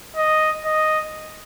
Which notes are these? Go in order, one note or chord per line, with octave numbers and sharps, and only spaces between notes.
D#5
D#5